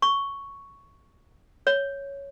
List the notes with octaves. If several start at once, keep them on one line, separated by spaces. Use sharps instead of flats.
C#6
C#5